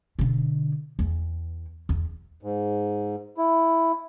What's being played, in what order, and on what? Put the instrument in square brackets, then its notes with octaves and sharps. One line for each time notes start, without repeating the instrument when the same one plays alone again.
[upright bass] B2 D3
E2
E2
[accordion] G#2
E4